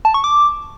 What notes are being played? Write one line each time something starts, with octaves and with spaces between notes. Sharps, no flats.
A5
C#6
D6